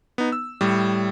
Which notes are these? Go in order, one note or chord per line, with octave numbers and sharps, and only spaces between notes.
B3 D#4
E6
A2 G3